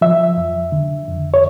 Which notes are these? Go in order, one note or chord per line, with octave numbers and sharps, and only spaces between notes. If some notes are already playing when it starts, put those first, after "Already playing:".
F3 E5
F2
D3
F2
C#5